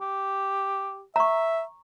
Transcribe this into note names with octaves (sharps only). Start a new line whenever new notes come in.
G4
E5 A#5 C#6